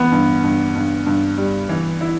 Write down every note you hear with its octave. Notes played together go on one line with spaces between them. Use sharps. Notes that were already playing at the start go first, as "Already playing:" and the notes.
Already playing: E3 B3
G2
G2
G2
G2
G3
E3
E4